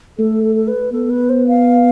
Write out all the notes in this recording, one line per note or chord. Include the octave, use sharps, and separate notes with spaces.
A3 A4
A4
A4
B4
B3 A4
B4
C5
F5